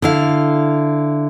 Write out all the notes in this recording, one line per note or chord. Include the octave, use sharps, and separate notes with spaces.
D3 E4 F5